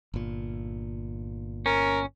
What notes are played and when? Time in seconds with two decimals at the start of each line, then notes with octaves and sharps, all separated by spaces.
0.14 G1 A#2
1.66 C#4 A#4